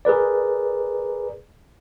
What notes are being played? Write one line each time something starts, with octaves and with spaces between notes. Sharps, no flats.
G#4 A#4 B4 D5